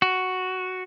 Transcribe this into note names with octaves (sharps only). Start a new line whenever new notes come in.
F#4